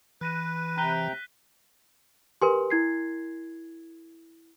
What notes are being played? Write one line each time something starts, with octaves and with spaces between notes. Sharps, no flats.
E3 B4 F#6 A#6 D#7
C3 G5 A#5 F#6 B6 G7
G4 A#4 B4 G#5 C6
E4 G#6 C7